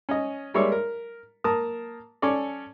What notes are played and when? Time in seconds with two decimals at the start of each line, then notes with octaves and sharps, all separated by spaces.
0.09 C#4 D#5
0.54 G3 G#3 A#3 C#5 D5 E5
0.72 A#4
1.44 A#3 A#4 A5 A#5 D#6
2.22 C#4 A4 C#5 D5